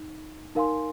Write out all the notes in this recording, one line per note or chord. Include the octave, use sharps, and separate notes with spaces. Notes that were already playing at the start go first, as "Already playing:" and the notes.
Already playing: D#4
D#4 A#4 F5 G#5 C6